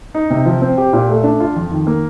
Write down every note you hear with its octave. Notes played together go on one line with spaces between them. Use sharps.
D#4
C3
F3
C4
G4
A#2
A3
D4
F4
F2
D#3
A#3